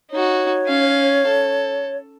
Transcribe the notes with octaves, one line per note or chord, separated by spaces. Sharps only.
D#4 F#4 C#5
C#4 F5
A4